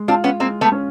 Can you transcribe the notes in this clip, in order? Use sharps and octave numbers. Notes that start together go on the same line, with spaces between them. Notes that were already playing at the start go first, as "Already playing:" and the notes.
Already playing: G#3
C4 D4 F4
B3 C#4
G#3 A#3 C4
A3 B3
C#4